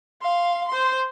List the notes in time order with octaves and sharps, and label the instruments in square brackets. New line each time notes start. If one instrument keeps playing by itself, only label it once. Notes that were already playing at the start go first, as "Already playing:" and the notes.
[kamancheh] F5 C6
C5 C6